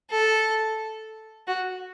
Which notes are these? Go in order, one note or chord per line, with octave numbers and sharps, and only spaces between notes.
A4
F#4